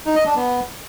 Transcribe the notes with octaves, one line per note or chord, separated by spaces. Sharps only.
D#4
D#5
D4
B3